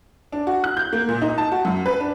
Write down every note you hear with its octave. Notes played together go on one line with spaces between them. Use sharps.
D4
F#4
F#6
G6
A#3
A#2
D#4
A5
F#4
F#2
B4
D4